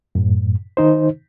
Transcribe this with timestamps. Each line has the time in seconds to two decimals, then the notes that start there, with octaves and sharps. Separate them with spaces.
0.15 F#2 A2
0.77 D#3 D#4 C5